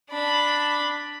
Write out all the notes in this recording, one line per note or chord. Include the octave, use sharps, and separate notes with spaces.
D4 B5